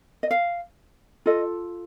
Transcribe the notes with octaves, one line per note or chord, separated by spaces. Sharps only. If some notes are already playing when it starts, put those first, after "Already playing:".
D#5
F5
F4 A4 D#5